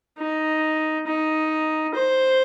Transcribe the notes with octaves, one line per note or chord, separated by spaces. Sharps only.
D#4
D#4
C5